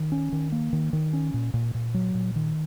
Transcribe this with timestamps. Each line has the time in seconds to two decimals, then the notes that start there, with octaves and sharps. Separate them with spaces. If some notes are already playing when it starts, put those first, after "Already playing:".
Already playing: D#3
0.12 C#4
0.32 D#3
0.52 A#3
0.73 D#3
0.93 D#3
1.13 C#4
1.34 A#2
1.54 A#2
1.75 A#2
1.94 F#3
2.14 A#2
2.36 D#3